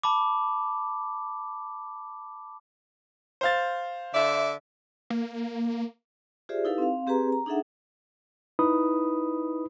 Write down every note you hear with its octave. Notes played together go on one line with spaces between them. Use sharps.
A5 B5 D6
C5 F5 A6
D3 D5 E5
A#3
F4 G4 G#4 C5 D5 E5
D#4 E4 G4 A4 B4 F5
C4 F5
C4 G4 G#4 B4 A#5
A#5
D4 D#4 G#4 A4 E5 F#5
D#4 E4 B4 B5 D#6